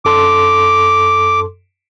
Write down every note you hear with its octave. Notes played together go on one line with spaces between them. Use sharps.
F#2 A4 C6 D6